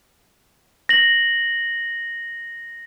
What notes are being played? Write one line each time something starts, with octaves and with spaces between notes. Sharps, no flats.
A#6 F#7